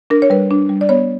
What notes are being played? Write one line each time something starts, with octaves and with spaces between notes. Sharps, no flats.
D4 A#4
C#5
G3 B4
D4
G3
D5
B3 C#5